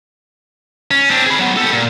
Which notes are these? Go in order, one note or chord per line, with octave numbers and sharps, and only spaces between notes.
C#4
C4 D4
G#4 B5
F#3 B3
G4 A4
A#2